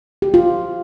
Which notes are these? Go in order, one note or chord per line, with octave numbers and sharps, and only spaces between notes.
G4
F4